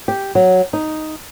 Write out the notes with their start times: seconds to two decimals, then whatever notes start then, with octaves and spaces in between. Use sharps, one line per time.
0.08 G4
0.35 F#3
0.73 D#4